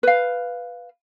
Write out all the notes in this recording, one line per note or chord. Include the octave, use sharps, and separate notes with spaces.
B4 F5